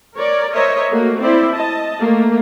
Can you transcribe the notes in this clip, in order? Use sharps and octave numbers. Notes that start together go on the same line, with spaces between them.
A#4 C#5 D5
A#4 C5 C#5 D#5 E5
A3 A#3 F#4
C4 E4 C5 D5
D#5 A5
A3 A#3